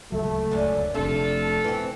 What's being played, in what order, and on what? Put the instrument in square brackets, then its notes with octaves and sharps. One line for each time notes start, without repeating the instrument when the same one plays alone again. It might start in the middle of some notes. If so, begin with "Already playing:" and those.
[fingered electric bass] D1 C#2 F#3 [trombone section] A3
[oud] F#2 D3
[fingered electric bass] F1 C3 [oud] A3 [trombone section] D4 [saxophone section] F4 A4
[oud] E3 C4